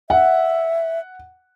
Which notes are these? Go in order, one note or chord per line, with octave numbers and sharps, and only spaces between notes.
E5 F#5